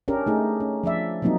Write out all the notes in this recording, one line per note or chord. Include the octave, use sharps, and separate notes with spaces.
C#4 D4 G4 A#4
A3 D#4 G#4
C#4
F3 D4 D5 E5
F3 F#3 A#3 C4 D#4